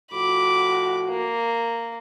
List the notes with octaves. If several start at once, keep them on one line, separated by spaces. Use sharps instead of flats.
A2 F3 F#4 B5 D6
A#3